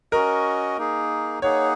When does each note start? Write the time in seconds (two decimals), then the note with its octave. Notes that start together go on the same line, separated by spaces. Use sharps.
0.12 C#4 F#4 A#4 D#5
0.77 A#3 D#4 G#4
1.42 A#3 D#4 G#4 C#5 F#5